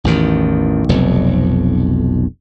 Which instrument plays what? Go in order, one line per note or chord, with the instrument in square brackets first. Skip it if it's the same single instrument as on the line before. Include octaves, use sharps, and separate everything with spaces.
[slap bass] A1 E2 D#3
F1 B1 F2